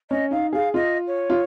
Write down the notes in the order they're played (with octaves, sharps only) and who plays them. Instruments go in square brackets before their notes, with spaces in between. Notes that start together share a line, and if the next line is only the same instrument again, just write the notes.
[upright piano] C#4 [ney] D#5
[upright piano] D#4 [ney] F5
[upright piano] G#4 [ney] F5
[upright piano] F4 [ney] D#5
[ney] C#5
[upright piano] F4